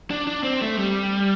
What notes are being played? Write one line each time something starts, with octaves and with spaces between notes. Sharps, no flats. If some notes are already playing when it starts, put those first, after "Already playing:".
D4
D4
C4
A3
G3